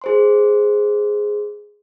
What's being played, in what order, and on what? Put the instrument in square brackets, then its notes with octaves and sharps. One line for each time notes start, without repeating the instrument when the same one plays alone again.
[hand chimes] G#4 C5 C6